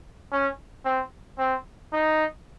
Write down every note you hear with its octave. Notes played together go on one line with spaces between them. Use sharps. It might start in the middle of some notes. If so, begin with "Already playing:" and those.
C#4
C4
C4
D#4